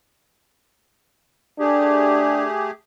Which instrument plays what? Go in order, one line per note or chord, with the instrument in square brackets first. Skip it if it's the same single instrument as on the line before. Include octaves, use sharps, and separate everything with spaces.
[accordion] A3 G4 G#4 [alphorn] D4